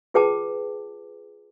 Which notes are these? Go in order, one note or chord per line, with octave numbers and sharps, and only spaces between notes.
F4 G#4 B4 G5 A5 D6